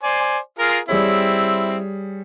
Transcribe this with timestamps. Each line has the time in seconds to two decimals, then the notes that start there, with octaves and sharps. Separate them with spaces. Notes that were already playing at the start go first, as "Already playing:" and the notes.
0.03 C5 D5 G#5
0.59 F4 G#4 A#4
0.89 G3 C4 E4 G#4 C#5